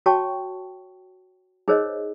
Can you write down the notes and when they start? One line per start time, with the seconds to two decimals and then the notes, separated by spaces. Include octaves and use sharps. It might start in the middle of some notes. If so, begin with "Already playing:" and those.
0.06 F#4 C#5 G5 A5 C#6
1.68 D#4 G#4 A#4 C5 C#5 D#5